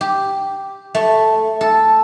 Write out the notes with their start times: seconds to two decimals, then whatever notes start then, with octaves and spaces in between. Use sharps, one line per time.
0.01 G4
0.95 A3
1.61 A4